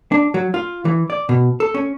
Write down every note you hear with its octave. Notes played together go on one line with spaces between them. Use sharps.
D4
F#3
F4
E3
D5
B2
A4
C#4